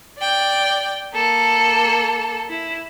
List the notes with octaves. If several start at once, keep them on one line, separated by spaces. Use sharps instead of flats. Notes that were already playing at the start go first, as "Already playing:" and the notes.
D5 G5
A#3 A4
E4